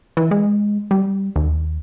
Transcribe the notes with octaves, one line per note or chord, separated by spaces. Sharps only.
E3
G#3
G3
D#2